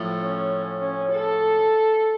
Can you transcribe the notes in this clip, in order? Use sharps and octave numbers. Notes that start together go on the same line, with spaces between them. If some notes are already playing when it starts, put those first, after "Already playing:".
Already playing: A2 F3 A3
C#4
C#4
A4